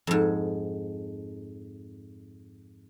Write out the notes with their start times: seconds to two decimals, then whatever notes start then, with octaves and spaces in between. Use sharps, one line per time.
0.07 F2 G#2